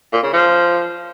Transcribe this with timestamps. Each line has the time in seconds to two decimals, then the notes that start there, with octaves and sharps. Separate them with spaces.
0.13 A#2
0.23 C#3
0.33 F3